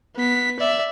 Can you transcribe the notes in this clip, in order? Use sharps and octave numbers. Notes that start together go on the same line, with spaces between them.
B3 B6
D5 E5